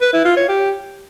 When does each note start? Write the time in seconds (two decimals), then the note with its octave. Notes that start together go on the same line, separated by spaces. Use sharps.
0.01 B4
0.13 E4
0.25 F4
0.37 C#5
0.49 G4